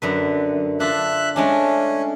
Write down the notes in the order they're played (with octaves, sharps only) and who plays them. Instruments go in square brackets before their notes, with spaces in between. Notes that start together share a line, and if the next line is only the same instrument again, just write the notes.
[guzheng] F#2 D3 B4
[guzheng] D4 F4 [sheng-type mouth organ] E5 F#6
[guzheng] G#3 A3 D4 [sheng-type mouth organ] C#4